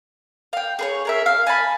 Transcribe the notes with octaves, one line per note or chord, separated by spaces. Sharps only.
F5 G5
G#4 B4 C#5
G#4 A#4 E5
F5
G#5 A5 B5